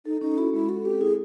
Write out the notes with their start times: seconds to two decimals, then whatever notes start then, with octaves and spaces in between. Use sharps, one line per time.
0.06 D#4 A4
0.21 C#4 D#4
0.38 E4 F#4
0.53 G#3 E4
0.69 F#4 A4
0.85 C4 G4
1.01 E4 G#4